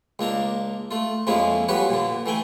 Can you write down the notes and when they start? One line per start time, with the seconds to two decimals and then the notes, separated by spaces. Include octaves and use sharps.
0.19 C#2 A#3 D4 A#5
0.91 A3 F4
1.27 F2 F3 G#3 A#3 C#4 E4
1.68 F3 G3 C#4 F#4 B4 C#5
1.89 A#2 D3
2.26 E3 A3 G5 G#5